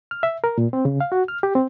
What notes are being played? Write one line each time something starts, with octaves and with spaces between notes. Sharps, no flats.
F6
E5
A#4
A#2
C4
C#3
F5
F#4
F6
G4
C4